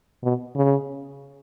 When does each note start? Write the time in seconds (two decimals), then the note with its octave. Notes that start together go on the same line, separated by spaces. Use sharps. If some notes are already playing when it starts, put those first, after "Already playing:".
0.23 B2
0.56 C#3